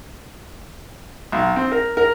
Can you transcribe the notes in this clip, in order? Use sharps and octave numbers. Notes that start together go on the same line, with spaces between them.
B1
C4
A#4
A#4